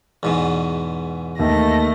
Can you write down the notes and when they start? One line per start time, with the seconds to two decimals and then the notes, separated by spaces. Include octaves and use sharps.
0.23 E2 G#2 B2
1.39 D#2 A3 A#6